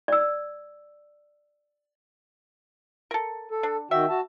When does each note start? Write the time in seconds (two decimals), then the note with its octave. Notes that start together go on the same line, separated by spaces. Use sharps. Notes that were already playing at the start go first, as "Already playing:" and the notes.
0.08 D5 E6
3.11 A4 A#4
3.51 A4
3.63 D4
3.91 D#3 F#4 E5 G5
4.09 F#4 A5